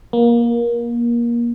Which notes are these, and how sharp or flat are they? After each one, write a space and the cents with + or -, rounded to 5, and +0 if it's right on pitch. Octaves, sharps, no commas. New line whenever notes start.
A#3 +25